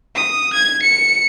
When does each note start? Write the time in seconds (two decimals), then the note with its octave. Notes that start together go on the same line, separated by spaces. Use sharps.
0.15 D#6
0.53 G#6
0.82 C#7